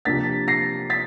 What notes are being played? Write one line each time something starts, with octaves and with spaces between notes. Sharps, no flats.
C3 F3 A#3 D4 A6 B6
A#6 C7
A6 B6